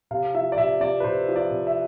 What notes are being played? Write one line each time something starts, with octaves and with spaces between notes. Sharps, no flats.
C3 F5
F3 E5
D5
C3 E5
C3 D5
B4
C3 C5
F3
D5
C3
E5